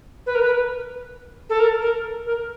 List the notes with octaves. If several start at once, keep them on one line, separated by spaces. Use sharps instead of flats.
B4
A#4
B4
A4
A#4
A#4
A#4